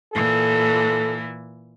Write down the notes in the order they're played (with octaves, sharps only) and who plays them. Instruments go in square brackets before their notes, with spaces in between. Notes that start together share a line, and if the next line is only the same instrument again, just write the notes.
[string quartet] A#2 E3 [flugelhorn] A4